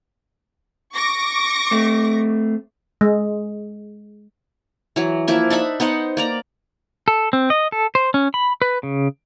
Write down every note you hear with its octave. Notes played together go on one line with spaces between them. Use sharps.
C#6 D6 A#6
A3 C4
G#3
E3 F#3
F3 A#3 E4 E5
D4 D#4 E5 B5
B3 D#4 C5 F#5
A#3 D5 A#5
A4
C4
D#5
A4
C5
C#4
B5
B4
C#3